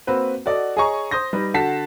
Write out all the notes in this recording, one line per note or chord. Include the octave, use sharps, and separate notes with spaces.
A#3 C4 F#4 B4
F#4 A4 D5 D#5 F#5
G#4 C#5 D#5 G#5 A#5 C#6
C5 C6 D#6 G6 A#6
G3 D#4 B4
D3 F#4 F#5 A5 B6 C7